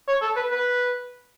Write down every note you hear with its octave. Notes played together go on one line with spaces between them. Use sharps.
C#5
A4
B4
B4